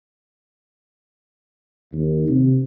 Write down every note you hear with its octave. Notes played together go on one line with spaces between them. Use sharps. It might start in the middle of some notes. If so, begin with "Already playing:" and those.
D#2
C3